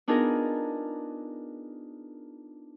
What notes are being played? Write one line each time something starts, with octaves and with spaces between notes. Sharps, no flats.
B3 D4 D#4 F4 G#4 A#4